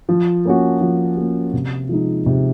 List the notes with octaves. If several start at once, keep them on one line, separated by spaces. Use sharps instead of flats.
F3
A#3 C#4 F#4
F3
A#3 C#4 F#4
C3
F3 G#3 D#4
C3